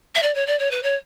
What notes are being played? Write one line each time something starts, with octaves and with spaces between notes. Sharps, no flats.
E5
D5
C#5
D5
C#5
B4
C#5